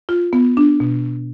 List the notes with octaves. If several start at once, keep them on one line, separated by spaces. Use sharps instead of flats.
F4
B3
D4
B2